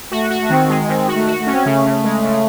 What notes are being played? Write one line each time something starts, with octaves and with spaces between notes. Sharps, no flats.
A3 F#4
F#4
A3
D#3 C4
G#3
D#3 C4
F#4
A3
F#4
A3
C#4
C4
C#3 A3
C#3
G#3
C#3